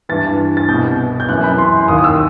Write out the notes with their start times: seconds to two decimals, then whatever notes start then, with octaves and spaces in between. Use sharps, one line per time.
0.09 G2 E3 A6
0.57 A6
0.68 C2 B2 G6
1.20 G6
1.29 F#2 E3 F#6
1.44 B5
1.58 C6
1.88 D#2 D#3 D#6
1.98 D#6
2.04 E6